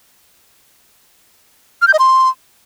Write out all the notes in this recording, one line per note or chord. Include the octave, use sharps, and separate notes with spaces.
F6
G6
D#5
C6